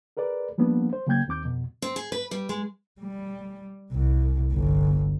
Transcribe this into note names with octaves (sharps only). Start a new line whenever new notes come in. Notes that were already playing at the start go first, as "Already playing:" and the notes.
G#4 A#4 B4 D5
F3 G3 A#3 B3 D4
C5
C#3 F#3 A#3 G5 G6 G#6
D#2 C4 D6 G6
F2 B2
C4
G#4
B4
G3
G#3
G3
C2
G1